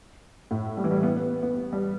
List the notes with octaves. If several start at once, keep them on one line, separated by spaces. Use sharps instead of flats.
A2
G3
E3
G3
B3
B3
B3
G3